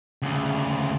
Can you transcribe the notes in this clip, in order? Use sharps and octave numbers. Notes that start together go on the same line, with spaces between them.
D2 C#3